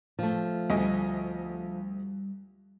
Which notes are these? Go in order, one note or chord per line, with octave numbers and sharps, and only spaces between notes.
F3 A3
D2 G3 D#5 G#5